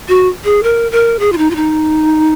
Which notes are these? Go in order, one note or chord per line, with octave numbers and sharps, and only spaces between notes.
F#4
G#4
A#4
A#4
G#4
F4
D#4
F4
D#4